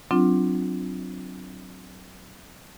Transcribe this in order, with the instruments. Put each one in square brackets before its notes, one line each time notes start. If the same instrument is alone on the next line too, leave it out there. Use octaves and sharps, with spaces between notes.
[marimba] F#3 C4 D4 F4